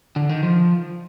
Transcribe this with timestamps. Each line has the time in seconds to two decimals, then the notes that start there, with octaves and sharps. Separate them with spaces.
0.16 D3
0.29 D#3
0.43 F3